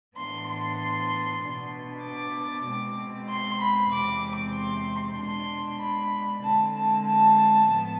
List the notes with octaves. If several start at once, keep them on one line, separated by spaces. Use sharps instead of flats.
A2 E3 B3 D4 C6
C6
B2 B3 D4
D6
B2 G#3 C4
C6
B5
E2 C3 G#3 C4 D6
C6
B2 G#3 D4 C6
B5
D3 G#3 C4 A5
A5
A5
A2 F3 B3